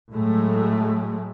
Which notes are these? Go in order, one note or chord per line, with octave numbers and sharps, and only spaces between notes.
A2 F#3 G#3 A3